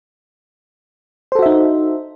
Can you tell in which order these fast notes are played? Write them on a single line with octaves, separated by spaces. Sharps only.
C5 A4 F#4 E5 D#4